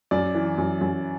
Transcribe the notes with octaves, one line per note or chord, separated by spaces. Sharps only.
F#2 D5
E3
F#2
F#2